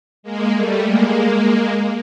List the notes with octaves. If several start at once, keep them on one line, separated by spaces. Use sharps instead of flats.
G#3 A#3
G3 A3
G#3 A#3